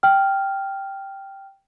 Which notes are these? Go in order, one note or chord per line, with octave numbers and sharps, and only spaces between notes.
G5 F6